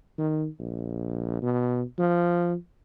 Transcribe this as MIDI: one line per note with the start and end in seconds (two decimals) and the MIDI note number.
0.18 0.47 51
0.60 1.41 34
1.42 1.83 47
1.98 2.55 53